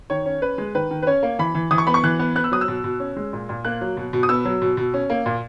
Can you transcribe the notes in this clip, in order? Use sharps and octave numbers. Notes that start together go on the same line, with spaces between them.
D#3 C#5
C#4
C#4 B4
G#3
D#3 B4
D#3
B4
C#4 C#5
A#3
E3 B5
E3
E3 D#6
C#6
B3 B5
C#6
E3 F#6
B3
B3 F#6
E6
F#3 D#6
E6
B2
B2
C#4
G#3
A#2
A#2
A#3 F#6
F#3
B2
B2
D#6
B3 E6
F#3
B2
B2
C#4
A#3
A#2